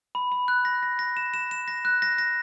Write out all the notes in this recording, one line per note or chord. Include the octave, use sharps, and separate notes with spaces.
B5
B5
F#6
A#6
A#6
A#6
E7
E7
E7
A#6
F#6
A#6
A#6